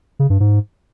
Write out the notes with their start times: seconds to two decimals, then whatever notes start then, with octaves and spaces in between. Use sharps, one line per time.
0.19 C#3
0.30 G2
0.40 G#2